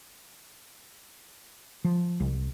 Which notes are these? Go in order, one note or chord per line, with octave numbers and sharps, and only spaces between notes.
F3
C2